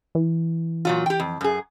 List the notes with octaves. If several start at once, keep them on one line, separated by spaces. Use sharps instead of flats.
E3
A#2 F#3 F4
G4 G5
F2
F#2 G#4